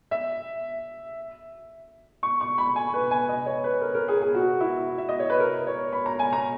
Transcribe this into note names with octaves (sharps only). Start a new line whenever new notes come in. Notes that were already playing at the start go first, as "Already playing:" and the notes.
E5
C#6
C#6
B5
G#5
B4
G#5
D#5
C#5
B4
A#4
A#4
G#4
G#4
F#4
E4
E5
D#5
C#5
B4
A#4
C#5
B5
A#5
G#5
A#5